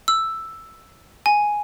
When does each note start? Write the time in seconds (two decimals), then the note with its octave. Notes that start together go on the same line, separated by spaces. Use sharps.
0.08 E6
1.26 G#5